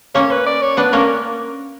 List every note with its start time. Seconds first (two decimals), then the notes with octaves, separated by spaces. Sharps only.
0.15 A#3 C#4 C#5
0.31 B4
0.47 D5
0.62 C#5
0.77 B3 D4 B4
0.93 A#3 C#4 A#4